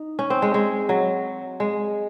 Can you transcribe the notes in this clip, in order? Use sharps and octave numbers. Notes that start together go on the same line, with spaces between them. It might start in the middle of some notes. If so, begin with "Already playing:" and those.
Already playing: D#4
C#4
C4
G#3
G#3
F#3
G#3